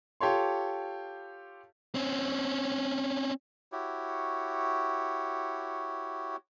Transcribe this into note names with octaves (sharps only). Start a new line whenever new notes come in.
F4 G4 A4 C#5 C6
C4 C#4
E4 F#4 G4 C#5